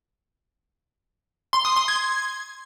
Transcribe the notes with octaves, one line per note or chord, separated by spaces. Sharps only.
C6
D#6
C6
G#6